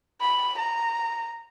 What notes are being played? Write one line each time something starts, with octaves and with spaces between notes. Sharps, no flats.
B5
A#5